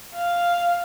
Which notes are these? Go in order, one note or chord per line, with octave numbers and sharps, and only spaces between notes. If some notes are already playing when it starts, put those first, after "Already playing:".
F5